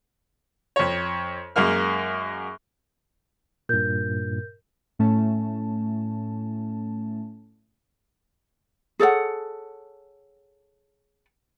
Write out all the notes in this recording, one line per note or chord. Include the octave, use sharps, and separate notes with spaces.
F2 C#5
F#2 G#3 A#3 F6
G2 A#2 A#4 G6
A2 A3 C#4 A5
G#4 A4 C#5 F#5